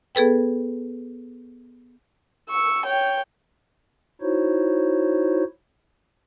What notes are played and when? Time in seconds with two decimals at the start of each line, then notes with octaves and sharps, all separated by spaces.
0.15 B3 G#4 A4 B4 G5
2.50 C#6 E6
2.86 C#5 G5
4.22 D#4 E4 F#4 C5 C#5